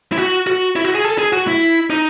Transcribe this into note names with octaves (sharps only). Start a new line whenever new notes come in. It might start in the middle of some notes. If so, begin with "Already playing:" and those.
E4
F#4
F#4
E4
F#4
G#4
A4
G#4
F#4
E4
D#4